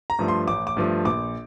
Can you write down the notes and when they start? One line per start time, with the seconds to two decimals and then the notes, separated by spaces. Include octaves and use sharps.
0.10 A#5
0.19 G2 F3 A3
0.28 C6
0.47 A1 D6
0.67 D6
0.77 G2 F3 A3
1.05 A#1 D6